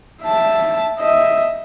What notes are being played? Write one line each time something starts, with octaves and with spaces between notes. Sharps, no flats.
E5 A5
D#5 E5